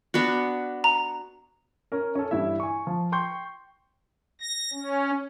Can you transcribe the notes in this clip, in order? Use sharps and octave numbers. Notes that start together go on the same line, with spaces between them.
B3 D4 F#4
A#5
C#4 A#4
C#4 A4
G2 E3 E4 E5
G#5 C#6
F3
G5 C6 C#6 G6
A#6
C#4